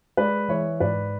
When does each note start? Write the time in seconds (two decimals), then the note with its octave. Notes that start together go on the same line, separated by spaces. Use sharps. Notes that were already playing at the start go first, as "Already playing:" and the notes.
0.17 G#3 B4 D5
0.48 E3 C#5 E5
0.80 G#2 B4 D5